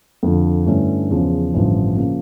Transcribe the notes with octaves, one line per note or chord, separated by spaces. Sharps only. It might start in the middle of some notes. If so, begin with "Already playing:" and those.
F2 D3 F3
G2 D3 A3 C#4 E4
E2 C#3 F3
A1 G2 D3 F3
C#3 F3 A#3